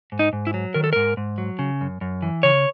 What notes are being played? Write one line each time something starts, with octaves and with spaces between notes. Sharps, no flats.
G#2
D#4
G#2
E4
F#3
D#3 A#4
A4
G#2 A#4
G#2
F#3
C#3
F#2
F#2
E3
C#3 C#5